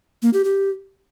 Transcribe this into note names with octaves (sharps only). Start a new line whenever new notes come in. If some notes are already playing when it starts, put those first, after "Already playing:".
A#3
G4
G4